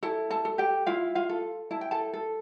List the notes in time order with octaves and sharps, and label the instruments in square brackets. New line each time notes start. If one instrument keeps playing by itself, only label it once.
[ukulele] E4 A4 A5
A4 A5
A4
G4 G5
E4 F4 F5
F4 F5
A4
E4 A5
G5
A4 A5
A4